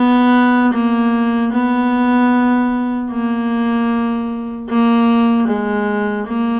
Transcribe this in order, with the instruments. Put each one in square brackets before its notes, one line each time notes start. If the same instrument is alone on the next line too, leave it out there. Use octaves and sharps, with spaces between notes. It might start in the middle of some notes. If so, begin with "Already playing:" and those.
Already playing: [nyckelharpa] B3
A#3
B3
A#3
A#3
G#3
A#3